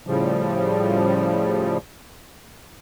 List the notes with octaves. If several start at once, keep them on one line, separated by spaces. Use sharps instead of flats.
A2 C#3 F3 G3